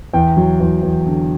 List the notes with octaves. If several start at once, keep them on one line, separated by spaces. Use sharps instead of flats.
E2 G5
F#3
E2
E2
D3